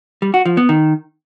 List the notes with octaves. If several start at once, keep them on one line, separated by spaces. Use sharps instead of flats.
G3
F#4
F3
B3
D#3